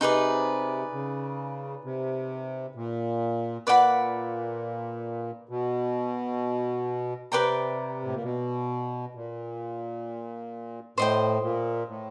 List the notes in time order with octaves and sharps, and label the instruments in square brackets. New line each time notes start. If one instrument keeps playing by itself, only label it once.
[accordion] C3 [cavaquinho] D#4 G#4 B4 D5
[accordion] C#3
C3
A#2
[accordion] A#2 [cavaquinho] B4 D5 F#5 B5
[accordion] B2
[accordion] C3 [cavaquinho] B4 D5 G5 A#5
[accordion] A2
A#2
B2
A#2
[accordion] A2 [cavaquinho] C5 D#5 G5
[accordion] A#2
A2